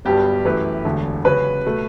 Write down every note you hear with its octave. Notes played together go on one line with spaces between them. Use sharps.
G1 G2 F#3 B3 D4 G4
F#2 E3 A3 E4 B4
E1 D2 D3 A3
C#3 F#3 C#4 F#4 B4
B2 F#3 A3